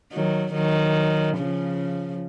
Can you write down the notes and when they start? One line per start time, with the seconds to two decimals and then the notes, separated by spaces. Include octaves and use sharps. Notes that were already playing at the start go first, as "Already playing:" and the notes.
0.12 D#3 F#3
0.54 D#3 F#3
1.38 C#3 F3